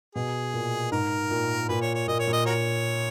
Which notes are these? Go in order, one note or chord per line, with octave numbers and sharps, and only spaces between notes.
B2 G#4
A#2
G#2 A#4
A#2
A#2 B4
C#5
C#5
A#2 D#5
C#5
A#2
D#5
F#4 A#4 C#5